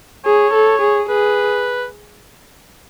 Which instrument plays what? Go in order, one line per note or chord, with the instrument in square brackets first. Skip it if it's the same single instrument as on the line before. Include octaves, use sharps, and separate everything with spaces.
[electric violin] G#4 [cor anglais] C#5
[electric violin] A4
G#4
[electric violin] G#4 [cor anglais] B4